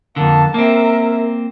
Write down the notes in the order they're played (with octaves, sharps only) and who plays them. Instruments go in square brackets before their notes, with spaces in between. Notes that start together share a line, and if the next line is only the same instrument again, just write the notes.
[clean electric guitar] F2 D3 [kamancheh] A#3 A5
[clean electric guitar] A#3 C4 [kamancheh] A#4 E5